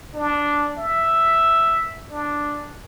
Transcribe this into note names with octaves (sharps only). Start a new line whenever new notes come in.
D4
E5
D4